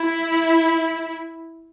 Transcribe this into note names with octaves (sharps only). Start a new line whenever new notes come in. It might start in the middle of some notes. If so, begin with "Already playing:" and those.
Already playing: E4